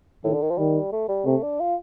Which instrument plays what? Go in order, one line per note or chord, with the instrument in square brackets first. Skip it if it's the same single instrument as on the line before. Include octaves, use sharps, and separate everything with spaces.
[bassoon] A2 [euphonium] D#3
[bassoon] D3
D#3
F3
[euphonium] D#3 [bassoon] G3
[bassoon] A3
G3
[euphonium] C3 [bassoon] A3
[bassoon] D4
F4